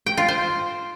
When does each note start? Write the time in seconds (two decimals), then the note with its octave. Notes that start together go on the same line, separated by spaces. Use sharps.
0.06 G5
0.17 F4
0.28 C5